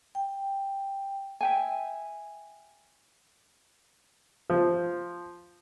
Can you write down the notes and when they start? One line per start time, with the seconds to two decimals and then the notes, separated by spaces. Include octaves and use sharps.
0.15 G5
1.41 E5 G5 G#5
4.50 F3